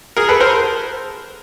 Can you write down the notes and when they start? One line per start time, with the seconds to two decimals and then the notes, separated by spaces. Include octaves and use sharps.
0.17 G#4 A#4
0.28 A4 B4
0.40 A#4 C5